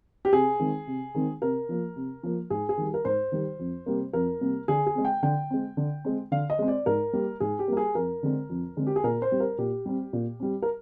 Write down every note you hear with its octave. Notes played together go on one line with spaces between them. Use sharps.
G4
C3 G#4
D#3 G#3 C4
C3
D#3 G#3 C4
C3 A#4
F3 A#3
C3
F3 A#3
G#2 G#4
G#4
D#3 G3
A#4
G#2 C5
D#3 G3
F2
C3 G3 A#3
F2 A#4
C3 G3 A#3
D3 G#4
G#4
G#3 C4
G5
D3 G5
G#3 C4
D3
G#3 C4
D3 F5
D#5
G#3 C4
D5
G#2 A#4
G3 A#3
G#2 G#4
G4
G3 A#3 A#4
G#4
F2 A#4
D3 G#3 C4
F2
D3 G#3 C4
G4
G#4
A#2 A#4
C5
G3 C4
A#4
A#2 G4
G3 C4
A#2
G3 C4
A#4